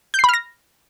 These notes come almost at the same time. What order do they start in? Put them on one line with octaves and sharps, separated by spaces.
G6 C7 B5 F6 A#6